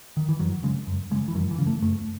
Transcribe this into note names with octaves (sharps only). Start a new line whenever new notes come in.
D#3
E3
F#2 F#3
C#3 G#3
F#2
C#3 G#3
E3
F#2 F#3
E3
C#3
A3
F#2 A3